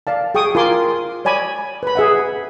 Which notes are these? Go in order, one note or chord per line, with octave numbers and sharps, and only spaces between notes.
D5 F5 A5
G#4 G5 C#6 D#6
F4 A#4 G#5 C6 D6
C#5 D5 G#5 B5 D6
B4 B5
G#4 E5 F#5